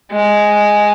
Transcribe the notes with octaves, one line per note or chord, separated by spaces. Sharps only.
G#3